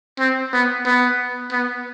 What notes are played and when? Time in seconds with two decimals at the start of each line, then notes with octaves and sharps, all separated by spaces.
0.19 C4
0.53 B3
0.86 B3
1.52 B3